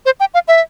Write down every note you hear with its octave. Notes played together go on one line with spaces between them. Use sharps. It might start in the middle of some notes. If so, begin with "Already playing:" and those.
C5
G5
F5
E5